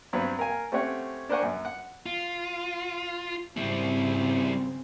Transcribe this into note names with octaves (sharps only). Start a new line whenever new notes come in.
G2 F#3 B3 C4 B4
A#4 F5 G#5
A3 C4 C#4 G4 C#5 F#5
D4 A#4 C5 F#5 G#5 C#6
F#2
F#5
F4
G#1 C#3 G3 C4 E4